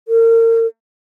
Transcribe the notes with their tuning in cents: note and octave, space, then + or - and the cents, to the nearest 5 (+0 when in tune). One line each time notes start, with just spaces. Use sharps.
A#4 -35